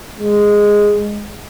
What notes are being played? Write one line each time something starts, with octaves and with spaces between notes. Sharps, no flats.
G#3